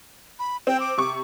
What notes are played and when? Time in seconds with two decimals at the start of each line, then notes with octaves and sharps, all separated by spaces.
0.39 B5
0.67 C4 G5
0.80 D6
0.98 C3 C#6